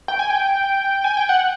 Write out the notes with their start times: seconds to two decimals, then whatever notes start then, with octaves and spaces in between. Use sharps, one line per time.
0.08 G5
0.19 G#5
0.30 G5
1.04 G#5
1.17 G5
1.29 F#5